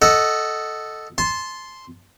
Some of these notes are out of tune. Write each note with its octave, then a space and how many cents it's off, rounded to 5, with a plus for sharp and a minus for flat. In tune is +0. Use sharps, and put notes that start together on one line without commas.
A4 +0 D#5 +0 F#5 +0
A5 -20 C6 +0